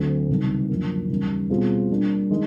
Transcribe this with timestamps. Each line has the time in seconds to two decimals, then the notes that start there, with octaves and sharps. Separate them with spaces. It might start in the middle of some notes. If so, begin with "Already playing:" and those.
Already playing: D2 D3 F#3 A3 C4
0.29 C#2 C3 D#3 G3
0.69 F#2 D3 F3 A#3
1.09 D#2 C#3 E3 G3 A#3
1.50 B2 G3 C4 F4 G#4
1.90 G3 A#3 D4
2.31 D#3 G#3